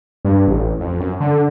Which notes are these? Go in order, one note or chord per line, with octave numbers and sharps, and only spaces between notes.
G2
A1
F2
F#2
D3